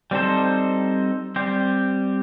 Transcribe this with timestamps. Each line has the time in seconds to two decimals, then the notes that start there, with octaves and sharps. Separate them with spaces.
0.11 G3 C4 D#4 A4 C5
1.36 G3 C4 G4 C5